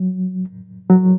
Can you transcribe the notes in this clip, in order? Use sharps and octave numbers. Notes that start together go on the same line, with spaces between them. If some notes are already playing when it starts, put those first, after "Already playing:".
Already playing: F#3
F#3